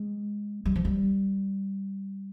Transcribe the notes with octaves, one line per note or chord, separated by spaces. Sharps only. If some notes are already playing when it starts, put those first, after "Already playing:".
Already playing: G#3
G3
F3
G3